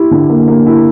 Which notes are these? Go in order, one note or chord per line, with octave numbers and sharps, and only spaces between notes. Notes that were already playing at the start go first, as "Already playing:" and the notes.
Already playing: E4 G4
D3
A#3
A#3
E4